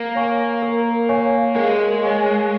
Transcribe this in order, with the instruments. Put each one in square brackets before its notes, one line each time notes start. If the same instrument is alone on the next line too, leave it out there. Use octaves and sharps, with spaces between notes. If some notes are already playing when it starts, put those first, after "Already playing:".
Already playing: [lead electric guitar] A#3 [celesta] A#4
[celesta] C#5 F5 G#5 C#6
A#4
C#5 F5 G#5 C#6
[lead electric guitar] G#3 [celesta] A#4
[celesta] C#5 F5 G#5 C#6